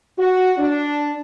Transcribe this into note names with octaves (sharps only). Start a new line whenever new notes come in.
F#4
D4